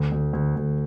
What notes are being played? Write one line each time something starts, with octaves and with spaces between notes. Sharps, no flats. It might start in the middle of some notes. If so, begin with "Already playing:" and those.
Already playing: D2
D2
D2
D2